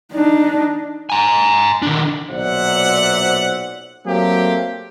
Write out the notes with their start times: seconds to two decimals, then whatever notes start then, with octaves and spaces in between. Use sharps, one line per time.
0.13 D4 D#4
1.10 G#5 A#5
1.82 D#3 D4
2.30 B1 A#2 C5 D5 E5 F#5
4.06 F#3 A3 A#3 C4 G4